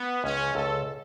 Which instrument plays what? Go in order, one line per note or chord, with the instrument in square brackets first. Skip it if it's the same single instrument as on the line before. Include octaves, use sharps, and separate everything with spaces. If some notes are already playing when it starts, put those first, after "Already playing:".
Already playing: [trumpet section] B3
[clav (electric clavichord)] C#2 [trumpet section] C#4
[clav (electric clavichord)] C#2 [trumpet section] A4